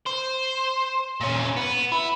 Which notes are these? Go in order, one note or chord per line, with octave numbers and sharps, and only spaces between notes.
C5
A#2 C#4
B3
E4